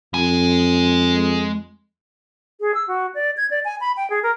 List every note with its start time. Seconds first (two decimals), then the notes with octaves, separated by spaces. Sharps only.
0.14 F2 G#3 G#5
2.60 G#4
2.75 E6
2.88 F#4
3.15 D5
3.37 G#6
3.51 D5
3.65 G#5
3.81 B5
3.97 G5
4.10 G#4
4.23 A#4